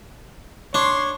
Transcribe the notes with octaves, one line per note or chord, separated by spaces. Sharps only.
D4 C#5 C6